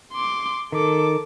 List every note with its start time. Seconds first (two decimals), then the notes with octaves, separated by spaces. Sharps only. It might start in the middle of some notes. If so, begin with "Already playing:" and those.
0.13 C6 D6
0.72 D#3 A4 D6